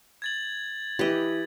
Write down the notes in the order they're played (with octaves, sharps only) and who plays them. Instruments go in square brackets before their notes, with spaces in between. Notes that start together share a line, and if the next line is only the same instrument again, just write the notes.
[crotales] G#6 A6 F#7
[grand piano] E3 B4 [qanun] G4 D#5